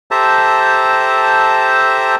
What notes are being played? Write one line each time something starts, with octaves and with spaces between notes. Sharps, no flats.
G4 A4 C5 E5 A5 A#5